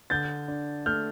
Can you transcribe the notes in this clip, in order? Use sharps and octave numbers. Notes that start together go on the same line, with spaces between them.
D3 G6 A6
D4
A3 F6 G6